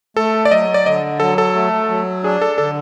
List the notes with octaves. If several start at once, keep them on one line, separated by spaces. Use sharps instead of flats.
A3 A4
D5
F#3 D#5
D5
D3 D#5
F#3 A4
A4
A3
F#3
D4 G#4
A4
D3 A4